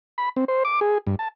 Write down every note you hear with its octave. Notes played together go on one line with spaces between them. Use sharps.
B5
C4
C5
D6
G#4
G2
A5